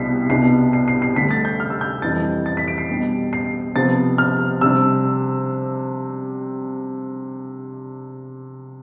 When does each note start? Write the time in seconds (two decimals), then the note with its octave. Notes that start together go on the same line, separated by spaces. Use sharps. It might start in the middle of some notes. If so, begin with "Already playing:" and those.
Already playing: C2 B2 G3 D4 B6 C7
0.30 C2 B2 B3 D4 C7
0.73 C7
0.88 C7
1.02 C7
1.16 D2 D3 G3 B6
1.31 A6
1.45 G6
1.60 F6
1.70 E6
1.81 G6
2.02 F2 E3 G3 D4 A6
2.46 A6
2.57 B6
2.68 D7
2.78 C7
2.89 B2 G3 D4
3.33 C7
3.76 C3 F3 B3 D4 A6
4.18 F6
4.61 C3 G3 D4 E6